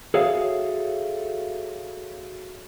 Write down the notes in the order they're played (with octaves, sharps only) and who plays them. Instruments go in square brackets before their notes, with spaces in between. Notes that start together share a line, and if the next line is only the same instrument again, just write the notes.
[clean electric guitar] F#4 G#4 A4 C#5 E5 F5